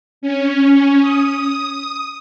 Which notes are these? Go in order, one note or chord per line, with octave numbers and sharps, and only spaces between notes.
C#4
D#6